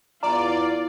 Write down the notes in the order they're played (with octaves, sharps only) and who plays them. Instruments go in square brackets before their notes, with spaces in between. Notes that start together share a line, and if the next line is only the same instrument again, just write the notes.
[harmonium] E2 [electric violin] F4 [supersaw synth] D5 [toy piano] A#5